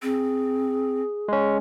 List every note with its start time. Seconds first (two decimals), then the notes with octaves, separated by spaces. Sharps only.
0.02 C4 G#4
1.28 G#3 C#4